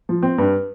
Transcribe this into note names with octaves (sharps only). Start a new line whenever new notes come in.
F3
C4
G2